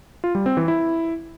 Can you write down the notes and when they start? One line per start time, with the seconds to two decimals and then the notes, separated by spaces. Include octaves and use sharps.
0.24 F4
0.35 G3
0.46 C4
0.57 E3
0.68 E4